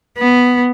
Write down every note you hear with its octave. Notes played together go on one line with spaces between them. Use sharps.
B3